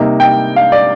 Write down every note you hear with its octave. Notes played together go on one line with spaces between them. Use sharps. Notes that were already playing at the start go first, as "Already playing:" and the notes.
Already playing: C3 G3 A#3 D#4
G5
F5
D5